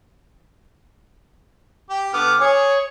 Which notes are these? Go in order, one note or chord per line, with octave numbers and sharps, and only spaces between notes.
G4
D3 B3 D6 F6
G#4 C#5